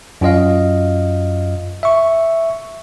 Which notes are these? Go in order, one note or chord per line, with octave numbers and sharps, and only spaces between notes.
F#2 F4 D#5 F5
E5 C#6